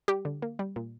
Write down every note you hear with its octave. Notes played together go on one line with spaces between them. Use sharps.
G3 G4
D3
A#3
G3
A#2